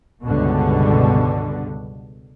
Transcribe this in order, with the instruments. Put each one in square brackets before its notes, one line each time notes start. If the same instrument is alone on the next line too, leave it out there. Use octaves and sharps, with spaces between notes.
[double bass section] C#2 G2 B2 D3